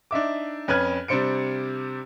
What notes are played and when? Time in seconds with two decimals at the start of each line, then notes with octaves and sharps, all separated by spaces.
0.11 D4 D#4 E5 D6
0.68 F2 C#4 B4 F6 F#6 G#6
1.08 C3 G3 D4 C5 C#7 D7